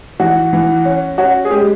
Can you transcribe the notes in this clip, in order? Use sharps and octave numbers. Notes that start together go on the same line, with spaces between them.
E3 F#4
E3
C#4
C#4 F#4
G#4
G#3 G4